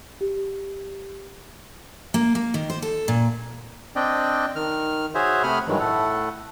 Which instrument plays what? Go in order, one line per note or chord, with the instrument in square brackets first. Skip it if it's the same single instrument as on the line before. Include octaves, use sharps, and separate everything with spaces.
[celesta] G4
[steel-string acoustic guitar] A#3
A#3
D#3
C5
A4
A#2
[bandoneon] C4 D4 D5 D#5 G5
D#3 F6
F#4 G#4 C5 C#5 E5
C3 A3 F#5 B5 D#6 F6
G2 D#3 E3 F#3 G#3
A2 A3 A4 F#5